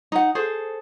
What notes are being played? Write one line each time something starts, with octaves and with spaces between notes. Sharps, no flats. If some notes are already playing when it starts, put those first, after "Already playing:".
D#4 F#5
G#4 A4 C5